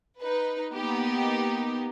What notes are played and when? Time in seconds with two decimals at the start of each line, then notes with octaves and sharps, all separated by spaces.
0.20 D#4 B4
0.76 A#3 B3 D#4 G4